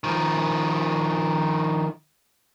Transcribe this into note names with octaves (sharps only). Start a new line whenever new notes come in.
D#3 F3